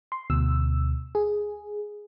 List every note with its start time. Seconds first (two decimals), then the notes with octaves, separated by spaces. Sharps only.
0.12 C6
0.30 D2 B2 E6
1.15 G#4